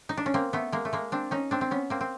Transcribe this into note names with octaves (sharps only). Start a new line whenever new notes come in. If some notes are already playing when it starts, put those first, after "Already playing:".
D#4
D4
C#4
A#3 C4
A3 B3
G#3 A#3
A3
G#3 A#3
C4 D4
C#4 D#4
C4 D4
C4
B3 C#4
A#3 C4
C4